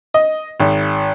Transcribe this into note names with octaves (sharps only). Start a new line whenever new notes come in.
D#5
G#1